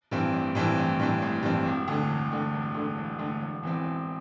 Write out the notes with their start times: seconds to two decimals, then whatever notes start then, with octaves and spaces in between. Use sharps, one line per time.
0.11 G2 E3 C4
0.34 A1
0.55 G2 E3 C4
0.78 A1
1.00 G2 E3 C4
1.22 A1
1.43 G2 E3 C4
1.65 E1
1.88 D2 D3
2.10 E1
2.32 D2 D3
2.54 E1
2.74 D2 D3
2.97 E1
3.19 D2 D3
3.41 E1
3.63 E2 E3 C4
3.84 E1